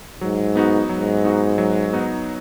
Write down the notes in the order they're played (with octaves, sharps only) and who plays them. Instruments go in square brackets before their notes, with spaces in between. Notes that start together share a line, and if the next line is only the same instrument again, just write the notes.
[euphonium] G#2 [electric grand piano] F#3
[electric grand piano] B3 D#4 F#4
[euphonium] G#2 [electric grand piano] F#3
[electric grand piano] B3 D#4 F#4
F#3
B3 D#4 F#4